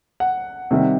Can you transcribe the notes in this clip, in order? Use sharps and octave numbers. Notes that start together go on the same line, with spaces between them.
F#5
C3 D#3 G3